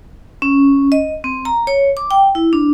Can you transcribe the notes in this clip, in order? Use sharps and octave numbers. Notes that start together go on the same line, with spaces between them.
C#4
D#5
C4
A#5
C#5
D6
G5
E4
D4